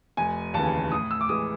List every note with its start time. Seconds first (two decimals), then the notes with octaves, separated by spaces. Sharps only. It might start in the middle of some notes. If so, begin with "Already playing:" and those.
0.17 F1 G#5
0.54 D#2 C#3 E3 A5
0.92 A2 D#6
1.11 E6
1.21 D6
1.29 E3 G#3 D#6